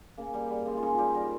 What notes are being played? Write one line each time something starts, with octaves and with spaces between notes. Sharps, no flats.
C#3 A#3
G3
G3
C#3 G#3
F4
C#3 D#4
G3 F4 G4
G3 A#4